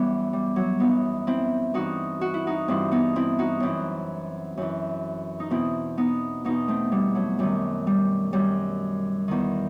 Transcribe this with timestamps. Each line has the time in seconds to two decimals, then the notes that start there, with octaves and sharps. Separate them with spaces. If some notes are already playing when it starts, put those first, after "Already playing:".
Already playing: F#2 E3 G3 B3
0.33 G3
0.56 F#3
0.80 F#2 E3 B3 D#4
1.27 C4 E4
1.74 G2 E3 D#4 F#4
2.21 F#4
2.34 E4
2.47 D#4 F#4
2.68 G2 E3 C4 E4
2.91 B3 D#4
3.16 C4 E4
3.39 D#4 F#4
3.60 F#2 E3 C4 E4
4.57 F#2 E3
5.40 D#4
5.50 E2 B2 C4 E4
5.97 B3 D#4
6.44 E2 B2 B3 D#4
6.68 A3 C4
6.92 G3 B3
7.15 F#3 A3
7.39 F#2 D#3 G3
7.87 G3
8.33 F#2 D#3 G3
9.28 E2 D#3